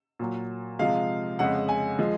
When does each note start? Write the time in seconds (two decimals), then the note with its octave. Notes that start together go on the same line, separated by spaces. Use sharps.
0.19 A#2 F#3
0.79 C3 F3 G#3 F5
1.39 F2 C#3 G#3 F#5
1.69 G#5
1.99 F3 G#3